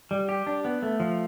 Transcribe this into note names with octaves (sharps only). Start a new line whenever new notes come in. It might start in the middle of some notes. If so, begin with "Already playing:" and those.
G3
G4
D4
B3
A3
F3